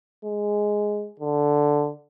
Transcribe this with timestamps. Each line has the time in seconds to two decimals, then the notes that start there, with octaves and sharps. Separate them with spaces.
0.25 G#3
1.20 D3